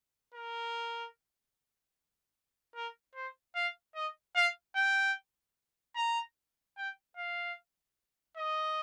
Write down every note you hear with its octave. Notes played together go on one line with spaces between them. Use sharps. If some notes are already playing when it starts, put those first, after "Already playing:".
A#4
A#4
C5
F5
D#5
F5
G5
A#5
G5
F5
D#5